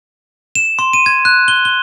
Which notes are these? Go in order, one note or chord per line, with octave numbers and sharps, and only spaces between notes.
E7
C6
D#7
G#6
F#6
G7
G7